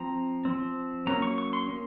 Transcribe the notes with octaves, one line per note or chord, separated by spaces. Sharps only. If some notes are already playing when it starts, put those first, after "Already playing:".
Already playing: F3 C4 A#5
F3 C4
F#3 A#3 C#4 A#5
C#6
C#6
C6
A#3 C#4